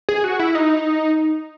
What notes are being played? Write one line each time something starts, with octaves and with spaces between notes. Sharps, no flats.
G#4
F#4
E4
D#4